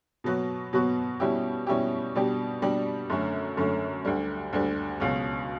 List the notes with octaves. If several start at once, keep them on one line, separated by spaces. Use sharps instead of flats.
B2 F#3 B3 F#4
B2 F#3 B3 F#4
B2 G3 C#4 E4 G4
B2 G3 C#4 E4 G4
B2 G3 D4 G4
B2 G3 D4 G4
F#2 D3 A3 C#4
F#2 D3 A3 C#4
D2 D3 G3
D2 D3 G3
C#2 B2 F#3 C#4